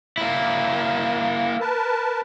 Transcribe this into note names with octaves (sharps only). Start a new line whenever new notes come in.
A#3 E4
A#4 B4 A5